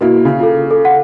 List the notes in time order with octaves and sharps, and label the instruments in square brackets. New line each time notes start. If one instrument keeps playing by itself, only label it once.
[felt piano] B2 A#3 E4
C#3
[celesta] F4 A4
A4
F#5